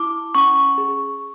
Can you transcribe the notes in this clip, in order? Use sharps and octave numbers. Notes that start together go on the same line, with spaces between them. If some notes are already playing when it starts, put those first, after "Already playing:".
Already playing: E4 D6
C#4 C#6
G#4